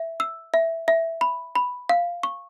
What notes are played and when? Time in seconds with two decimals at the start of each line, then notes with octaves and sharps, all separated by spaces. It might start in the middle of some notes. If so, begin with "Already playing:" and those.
Already playing: E5
0.20 E6
0.54 E5
0.88 E5
1.21 B5
1.55 B5
1.89 F5
2.23 C#6